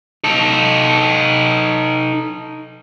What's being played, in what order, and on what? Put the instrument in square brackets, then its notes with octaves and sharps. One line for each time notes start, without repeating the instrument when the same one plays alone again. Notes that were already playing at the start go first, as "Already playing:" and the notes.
[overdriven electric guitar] D#4 A4